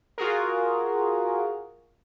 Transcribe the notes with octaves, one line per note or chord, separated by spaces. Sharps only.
F4 F#4 G#4 A#4